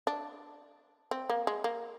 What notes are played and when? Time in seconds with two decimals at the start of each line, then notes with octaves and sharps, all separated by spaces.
0.07 D4
1.11 C4
1.29 A#3
1.47 G#3
1.64 A#3